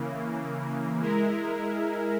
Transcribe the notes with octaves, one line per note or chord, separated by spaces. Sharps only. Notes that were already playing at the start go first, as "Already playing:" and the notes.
Already playing: C#3 E3 A#3
G#3 E4 A#4